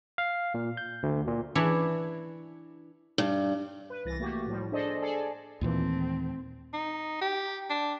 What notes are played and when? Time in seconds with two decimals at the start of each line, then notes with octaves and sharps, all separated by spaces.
0.18 F5
0.54 A#2
0.77 G6
1.03 D2
1.27 A#2
1.55 E3 D4 E4 C#5
3.18 G2
3.90 B4
4.05 C2 E3 A6 A#6
4.20 A3 A#3 F#4 G4
4.47 A2 F3 G3
4.72 D4 G#4 A4 C5 D5 D#5
5.02 G#4 A4 D5 G#5 A5
5.61 D#2 A#2 E3 A3 C4
6.74 D#4
7.22 G4
7.70 D4